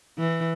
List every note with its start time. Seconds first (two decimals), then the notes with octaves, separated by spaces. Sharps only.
0.19 E3